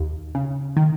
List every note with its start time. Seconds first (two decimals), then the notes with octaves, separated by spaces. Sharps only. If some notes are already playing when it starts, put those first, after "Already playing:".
Already playing: D#2
0.35 C#3
0.77 D#3